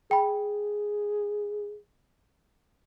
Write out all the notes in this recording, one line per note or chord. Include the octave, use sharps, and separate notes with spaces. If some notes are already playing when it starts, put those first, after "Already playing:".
G#4 G5 B5